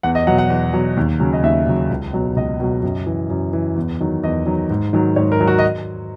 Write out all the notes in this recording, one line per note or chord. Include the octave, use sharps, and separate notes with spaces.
E2 F#5
D#5
B2 F#3 F#5
F#5
E2
B2 F#3
D#2
C#3 F#3
D#5
D#2 E5
C#3 F#3
C#2
B2 F#3
C#2 D#5
B2 F#3
F#2
E3
F#2
E3
E2
D#3 F#3
E2 D#5
D#3 F#3
G#2
D#3 F#3
G#2 C#5
A#4
D#3 F#3
F#4
D#5